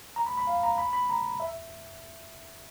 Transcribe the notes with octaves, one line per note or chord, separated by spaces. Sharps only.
A#5
B5
B5
F5
A#5
B5
B5
A#5
E5